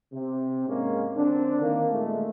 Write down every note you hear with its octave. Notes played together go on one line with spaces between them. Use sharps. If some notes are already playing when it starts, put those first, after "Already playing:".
C3
G#2 G#3 A#3 C#4
D3 C4 D4
D#3 A#3
A#2 G#3 A3